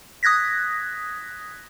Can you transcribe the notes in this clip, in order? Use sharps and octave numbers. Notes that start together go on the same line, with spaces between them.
D#6 F#6 G#6 A#6 B6